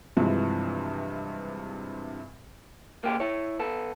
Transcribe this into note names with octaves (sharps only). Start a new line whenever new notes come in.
G2 C3 E3 F3 G#3
A#3 G4 G#4
E4 C#5
B3 A4